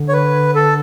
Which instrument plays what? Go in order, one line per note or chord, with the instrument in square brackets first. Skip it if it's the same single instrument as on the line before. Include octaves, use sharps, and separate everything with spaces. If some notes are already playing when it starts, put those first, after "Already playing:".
Already playing: [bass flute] D3
[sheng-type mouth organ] C#5
B4
A4